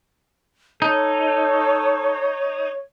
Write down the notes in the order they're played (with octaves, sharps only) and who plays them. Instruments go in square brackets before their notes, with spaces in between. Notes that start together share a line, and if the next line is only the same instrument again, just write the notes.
[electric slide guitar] D#4 [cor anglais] A4 [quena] C#5